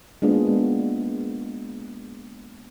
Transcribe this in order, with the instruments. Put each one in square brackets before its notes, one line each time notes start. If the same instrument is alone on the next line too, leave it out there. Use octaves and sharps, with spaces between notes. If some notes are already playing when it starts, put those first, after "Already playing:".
[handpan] G#3 A#3 B3 D4 F4 G#4